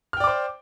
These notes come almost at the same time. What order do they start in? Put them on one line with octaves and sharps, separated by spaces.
F6 G5 D5 D6 C5